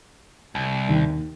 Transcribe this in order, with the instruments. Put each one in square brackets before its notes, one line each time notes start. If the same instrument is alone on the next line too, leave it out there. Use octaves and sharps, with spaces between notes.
[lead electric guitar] C2
[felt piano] D#2